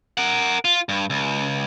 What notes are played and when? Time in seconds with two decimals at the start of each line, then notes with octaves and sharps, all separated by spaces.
0.18 A#4 F#5
0.65 F4
0.89 G2
1.10 C#2